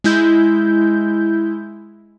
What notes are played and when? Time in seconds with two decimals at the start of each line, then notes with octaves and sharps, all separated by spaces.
0.04 G#3 E4 G6